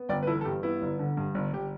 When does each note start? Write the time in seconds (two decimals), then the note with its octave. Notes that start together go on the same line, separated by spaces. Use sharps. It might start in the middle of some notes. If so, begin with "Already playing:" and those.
Already playing: B3
0.09 G1 D5 G5
0.23 B4
0.27 E3 E4 A4
0.41 A4
0.45 G2 G4
0.63 B3 E4
0.82 G1
0.99 D3
1.17 G2
1.35 G1
1.53 G1 G4